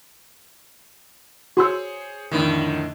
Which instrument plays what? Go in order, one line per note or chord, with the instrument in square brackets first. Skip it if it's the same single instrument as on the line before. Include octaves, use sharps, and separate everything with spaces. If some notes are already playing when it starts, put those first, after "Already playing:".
[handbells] F#4 C6 E6 [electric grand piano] G#4 C5 C#5
[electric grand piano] F2 A2 D3 [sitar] D#3